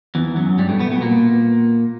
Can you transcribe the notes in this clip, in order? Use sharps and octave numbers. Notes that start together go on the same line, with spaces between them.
E2 E3
F#2 F#3
G2 G3
A2 A3
B2 B3
B2 B3
A#2 A#3